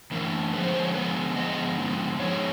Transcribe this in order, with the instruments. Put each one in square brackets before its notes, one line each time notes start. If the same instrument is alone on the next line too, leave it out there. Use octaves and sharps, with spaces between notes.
[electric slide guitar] E3 A3 D4 A#4
D3 F3 G#3 B3 B4
C5
C5
C#5
D3 F3 G#3 B3 B4
D3 F3 G#3 B3 D#5
D3 F3 G#3 B3
F3 G#3 B3 D#4 C#5